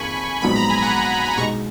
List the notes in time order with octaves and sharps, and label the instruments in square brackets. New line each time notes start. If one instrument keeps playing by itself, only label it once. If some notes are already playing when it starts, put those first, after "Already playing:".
Already playing: [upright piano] F2 D#3 A#3 G#4 [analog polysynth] G#5 B5 C#6
[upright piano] A#1 G#2 F#3 B3 [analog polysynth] B5
[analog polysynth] A#5
G#5
F#5 A#5
[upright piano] B2 G#3 D#4 [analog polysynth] A#5 C#6